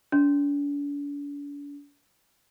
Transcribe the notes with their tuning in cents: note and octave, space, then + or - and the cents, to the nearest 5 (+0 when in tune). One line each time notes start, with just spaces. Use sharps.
D4 -45